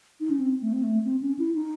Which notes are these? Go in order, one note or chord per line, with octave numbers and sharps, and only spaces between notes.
D#4
C#4
C4
A3
C4
A3
C4
C#4
E4
D#4